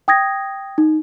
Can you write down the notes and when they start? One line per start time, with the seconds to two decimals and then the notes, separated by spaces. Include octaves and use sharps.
0.08 G5 D#6 G#6 A#6
0.78 D#4